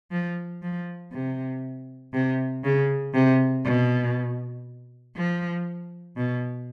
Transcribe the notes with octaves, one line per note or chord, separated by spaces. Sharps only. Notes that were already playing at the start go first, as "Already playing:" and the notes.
F3
F3
C3
C3
C#3
C3
B2
F3
B2